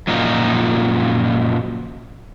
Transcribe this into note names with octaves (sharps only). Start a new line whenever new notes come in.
F#2 A#2 F3 D#4